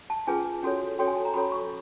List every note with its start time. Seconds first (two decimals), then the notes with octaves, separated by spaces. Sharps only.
0.10 A5
0.27 C#4 F4 G#4 B4 G#5
0.63 C#4 F#4 A4 C#5
0.98 C#4 F#4 A4 C#5 G5
1.07 G#5
1.16 A5
1.25 A#5
1.34 C#4 F#4 A4 C#5 B5
1.52 C#6